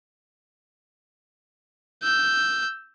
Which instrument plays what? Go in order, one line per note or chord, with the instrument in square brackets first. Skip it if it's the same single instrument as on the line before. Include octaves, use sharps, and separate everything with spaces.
[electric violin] E6 G6